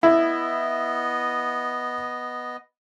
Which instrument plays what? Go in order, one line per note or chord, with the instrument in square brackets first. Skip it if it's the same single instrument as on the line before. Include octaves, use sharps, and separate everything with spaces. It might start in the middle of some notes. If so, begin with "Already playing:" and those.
[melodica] B3 D#5 [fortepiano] E4